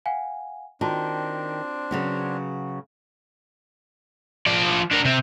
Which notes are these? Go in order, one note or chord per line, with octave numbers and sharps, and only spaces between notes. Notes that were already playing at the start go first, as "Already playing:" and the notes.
F5 F#5 G#5
D#3 C4 D4 F4 F#4 A5
C#3 F#3 B3
F3 D5
D4 A#4
C3 C4